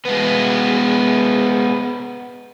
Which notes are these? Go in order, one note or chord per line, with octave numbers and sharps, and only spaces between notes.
G#3 B3